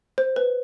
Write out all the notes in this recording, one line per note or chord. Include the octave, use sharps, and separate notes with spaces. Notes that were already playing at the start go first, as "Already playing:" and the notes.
C5
B4